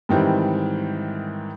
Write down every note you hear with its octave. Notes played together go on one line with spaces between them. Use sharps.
G#2 D#3 E3 G3 C4